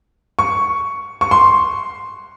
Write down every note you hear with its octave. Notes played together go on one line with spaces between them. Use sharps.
C#6
C#6
C6